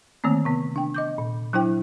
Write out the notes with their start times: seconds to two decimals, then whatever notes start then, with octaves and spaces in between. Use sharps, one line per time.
0.24 D3 D#3 A3 A#3 C4
0.45 C3 B3
0.76 D4 G5
0.94 D#5 D6 G6
1.18 A#2
1.53 F#3 D4 E4 C5 G5